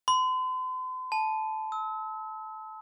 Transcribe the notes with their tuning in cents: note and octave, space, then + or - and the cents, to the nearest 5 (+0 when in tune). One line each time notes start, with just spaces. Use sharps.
C6 -40
A5 -15
E6 -40